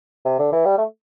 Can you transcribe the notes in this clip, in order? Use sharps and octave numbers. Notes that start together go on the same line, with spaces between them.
C3
D3
E3
G3
A3